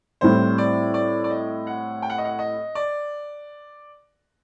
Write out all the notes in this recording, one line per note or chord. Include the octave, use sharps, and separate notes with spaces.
A2 G3 C4 C5
D5
D5
D5
D#5
F#5
G5
F#5
D#5
F#5
D#5
D5